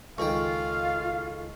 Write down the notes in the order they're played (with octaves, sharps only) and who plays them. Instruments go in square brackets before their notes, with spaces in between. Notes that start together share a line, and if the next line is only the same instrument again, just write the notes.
[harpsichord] C#2 D#3 G5 [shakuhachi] F4 [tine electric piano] A4 C#6 [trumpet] F5